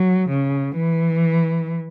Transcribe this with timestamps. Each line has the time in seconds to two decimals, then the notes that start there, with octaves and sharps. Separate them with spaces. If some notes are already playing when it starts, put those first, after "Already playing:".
Already playing: F#3
0.28 C#3
0.75 E3